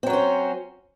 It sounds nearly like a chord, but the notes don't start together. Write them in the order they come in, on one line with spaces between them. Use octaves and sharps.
C4 F#3 C#4 C5